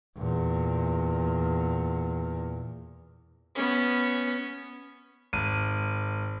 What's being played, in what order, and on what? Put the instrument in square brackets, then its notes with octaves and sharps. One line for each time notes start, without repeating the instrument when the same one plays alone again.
[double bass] E2 A#2
[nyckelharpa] B3 C#4
[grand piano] G#1 D#7